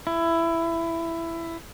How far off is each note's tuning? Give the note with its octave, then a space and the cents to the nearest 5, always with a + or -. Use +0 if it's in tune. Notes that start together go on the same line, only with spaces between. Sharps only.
E4 +15